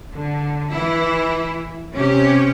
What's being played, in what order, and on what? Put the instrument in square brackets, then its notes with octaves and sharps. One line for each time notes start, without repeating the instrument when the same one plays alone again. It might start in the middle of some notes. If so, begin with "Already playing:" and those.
[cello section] D3
E3 E4
C3 C#4 G4